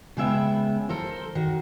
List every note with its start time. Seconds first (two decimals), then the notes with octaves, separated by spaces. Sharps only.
0.17 C#3 G#3 B3 E5 G5
0.89 A4 A#4 C5
1.35 D#3 F#4